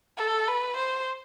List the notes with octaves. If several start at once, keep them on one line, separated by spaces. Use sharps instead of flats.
A4
B4
C5